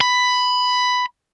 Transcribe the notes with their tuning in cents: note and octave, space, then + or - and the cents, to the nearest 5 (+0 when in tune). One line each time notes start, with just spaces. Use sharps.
B5 +10